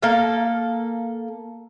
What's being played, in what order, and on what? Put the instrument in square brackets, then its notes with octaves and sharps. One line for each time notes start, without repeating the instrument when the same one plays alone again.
[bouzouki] A#3 A4 F5